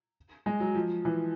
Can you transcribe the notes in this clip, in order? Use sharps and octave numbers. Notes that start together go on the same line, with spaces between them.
G#3
F#3
F3
E3